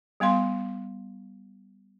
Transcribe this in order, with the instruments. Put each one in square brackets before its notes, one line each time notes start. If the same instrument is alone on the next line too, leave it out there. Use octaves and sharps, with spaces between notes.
[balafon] G3 B3 F5 C6